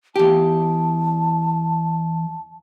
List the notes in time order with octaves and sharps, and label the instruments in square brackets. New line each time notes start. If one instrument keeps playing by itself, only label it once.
[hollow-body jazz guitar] E2 G4 [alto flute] A5